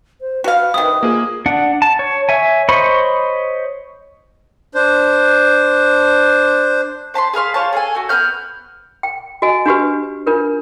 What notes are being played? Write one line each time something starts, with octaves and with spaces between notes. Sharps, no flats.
C5
F#4 B4 F5
C3 D#3 D#6
A#3 F4 G#4
D4 F#5
A5
C#5
C#5 E5 G#5
C5 C#5 D#5 B5 C#6
D4 C5
C5 A5 B5 C6
G#4 B4 F5 C6
F4 C5 C#5 A5
G#4 A4 G#5
A3 F#4
B3 B5 F6 G6
G5
F#4 D#5 G#5
D4 F#4 G4 B4
D4 F4 A#4 B4